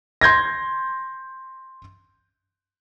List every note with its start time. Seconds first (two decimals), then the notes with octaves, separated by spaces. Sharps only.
0.21 C6 G6 G#6 A#6